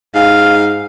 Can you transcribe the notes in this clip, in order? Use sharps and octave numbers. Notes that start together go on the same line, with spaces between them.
G#2 F5